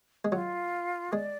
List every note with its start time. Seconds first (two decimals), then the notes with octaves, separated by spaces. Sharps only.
0.25 G#3
0.32 F#3 F4
1.13 G#3 D5